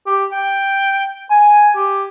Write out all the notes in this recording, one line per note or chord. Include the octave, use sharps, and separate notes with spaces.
G4
G5
G#5
G4